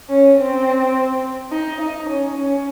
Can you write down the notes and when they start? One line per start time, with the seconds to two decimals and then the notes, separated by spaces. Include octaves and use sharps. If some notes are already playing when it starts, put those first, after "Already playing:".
0.10 C#4
0.37 C4
1.52 D#4
1.80 D#4
2.09 C#4
2.37 C#4